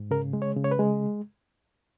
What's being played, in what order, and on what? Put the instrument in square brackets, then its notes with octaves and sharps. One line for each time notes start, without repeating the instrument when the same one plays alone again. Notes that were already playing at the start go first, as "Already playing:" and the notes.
Already playing: [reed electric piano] G#2
C#3 A#4
G#3
C#5
C#3
C#5
B4
G#3